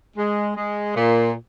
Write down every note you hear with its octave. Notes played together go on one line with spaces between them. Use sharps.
G#3
G#3
A#2